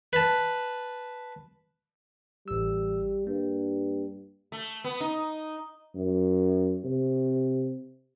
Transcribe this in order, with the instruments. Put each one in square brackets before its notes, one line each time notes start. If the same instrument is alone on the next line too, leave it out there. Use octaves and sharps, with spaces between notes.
[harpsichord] B4 A5
[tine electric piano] A1 E6 [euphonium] G3
[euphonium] G2 [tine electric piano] A#3
[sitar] A3
B3
D#4
[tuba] F#2
C3